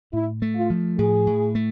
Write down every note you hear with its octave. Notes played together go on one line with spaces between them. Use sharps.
A2 E4
A3
F4
F3
A2 G#4
A2
A3